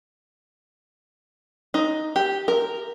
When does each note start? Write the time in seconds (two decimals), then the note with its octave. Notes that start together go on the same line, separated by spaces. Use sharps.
1.74 D#4
2.16 G4
2.48 A#4